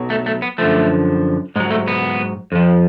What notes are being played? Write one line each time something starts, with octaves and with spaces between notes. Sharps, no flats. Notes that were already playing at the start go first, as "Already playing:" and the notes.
Already playing: B1 B2 F#3
A3
A3
B3
F#2 D3 F3 A3
G#2 F#3 G#3
A3
B3
F2 F3